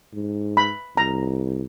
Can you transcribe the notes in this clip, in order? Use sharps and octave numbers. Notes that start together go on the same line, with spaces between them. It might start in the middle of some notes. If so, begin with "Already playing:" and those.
G#2
B5
C2 A#5